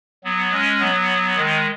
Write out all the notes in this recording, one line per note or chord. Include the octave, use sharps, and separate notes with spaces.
F#3 B3
G#3 C#4
F#3 B3
D#3 G#3